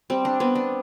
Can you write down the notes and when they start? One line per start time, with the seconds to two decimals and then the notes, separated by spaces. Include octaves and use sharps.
0.10 G3 C4
0.25 D4
0.40 B3 C4
0.55 D4